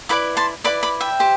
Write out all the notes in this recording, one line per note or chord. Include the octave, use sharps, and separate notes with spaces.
E4 B4 D5 B5 D6
A5 C6
E4 B4 D5 B5 D6
B5 D6
E5 G5
G4 C5